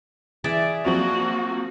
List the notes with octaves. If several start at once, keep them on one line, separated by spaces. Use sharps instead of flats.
E3 G#4 D5 E5
F3 F#3 A#3 C4 F#4 C#6